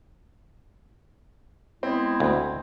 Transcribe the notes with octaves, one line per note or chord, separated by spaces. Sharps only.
G#3 B3 C4 E4
D2